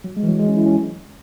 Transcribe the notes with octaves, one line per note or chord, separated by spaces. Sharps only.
F#3
G#3
E3
F#3
G#3
C#4
E4
C#4